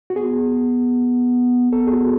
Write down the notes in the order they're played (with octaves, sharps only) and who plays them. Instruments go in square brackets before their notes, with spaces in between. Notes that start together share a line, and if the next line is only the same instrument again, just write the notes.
[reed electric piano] F#4
[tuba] B3 [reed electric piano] G#4
[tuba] B3 [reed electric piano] A4
[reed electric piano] G#4
F#4